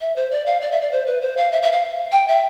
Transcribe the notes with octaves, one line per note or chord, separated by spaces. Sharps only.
E5
C5
D5
F5
D5
E5
D5
C5
B4
C5
F5
E5
E5
F5
G5
E5